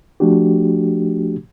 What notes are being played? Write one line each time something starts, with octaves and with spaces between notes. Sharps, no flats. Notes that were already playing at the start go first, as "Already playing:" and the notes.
F3 A3 D4 F#4 G4